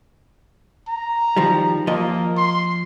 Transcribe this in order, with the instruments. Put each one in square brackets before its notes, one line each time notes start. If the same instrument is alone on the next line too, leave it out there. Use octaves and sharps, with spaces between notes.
[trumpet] A#5
[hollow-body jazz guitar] D#3 F3 G3
[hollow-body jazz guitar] F3 D#5 [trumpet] A#3
[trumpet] C6